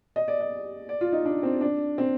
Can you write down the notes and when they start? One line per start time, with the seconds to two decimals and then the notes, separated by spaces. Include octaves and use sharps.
0.16 D#5
0.28 D5
0.40 D#5
0.89 D5
1.01 F4
1.13 D#4
1.25 D4
1.43 C4
1.61 D4
1.98 C4